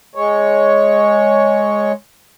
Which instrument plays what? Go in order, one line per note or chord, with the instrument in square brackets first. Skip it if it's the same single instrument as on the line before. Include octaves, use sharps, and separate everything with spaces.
[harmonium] G#3 C#5